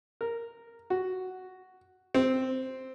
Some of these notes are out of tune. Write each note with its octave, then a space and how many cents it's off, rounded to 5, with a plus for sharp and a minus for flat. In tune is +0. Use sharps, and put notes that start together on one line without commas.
A#4 -5
F#4 +5
C4 -5